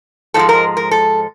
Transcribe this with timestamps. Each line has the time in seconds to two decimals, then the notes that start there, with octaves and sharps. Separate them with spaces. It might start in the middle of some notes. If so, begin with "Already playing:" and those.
0.34 G#2 F3 G#3 A4
0.49 A#4
0.77 A#4
0.91 A4